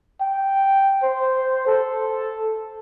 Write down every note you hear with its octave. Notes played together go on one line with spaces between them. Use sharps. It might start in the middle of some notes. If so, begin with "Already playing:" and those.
G5
C5
A4